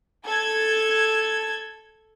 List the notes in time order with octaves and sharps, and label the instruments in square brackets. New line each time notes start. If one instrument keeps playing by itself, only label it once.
[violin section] A4 G#6